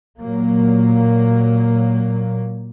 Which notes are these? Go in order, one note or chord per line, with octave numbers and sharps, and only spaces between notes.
A#2 F#3 A#3